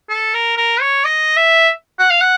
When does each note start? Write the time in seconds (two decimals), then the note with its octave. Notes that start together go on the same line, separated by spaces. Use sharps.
0.09 A4
0.34 A#4
0.57 A#4
0.81 C#5
1.05 D#5
1.37 E5
1.99 F#5
2.10 F5
2.21 F#5